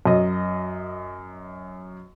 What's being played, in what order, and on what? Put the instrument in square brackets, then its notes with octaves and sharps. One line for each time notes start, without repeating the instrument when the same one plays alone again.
[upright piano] F#2 D#5